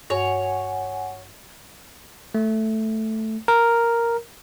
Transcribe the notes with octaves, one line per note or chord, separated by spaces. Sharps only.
G2 C#5 F#5 G#5
A3
A#4